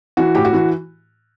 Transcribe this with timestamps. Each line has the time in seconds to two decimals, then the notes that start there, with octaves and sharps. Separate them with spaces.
0.17 E3 F#4
0.35 A2 G4
0.45 F#4
0.53 E3